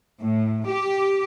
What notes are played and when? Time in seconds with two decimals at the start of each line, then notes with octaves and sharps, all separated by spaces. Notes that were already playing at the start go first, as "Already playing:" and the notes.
0.20 A2
0.66 G4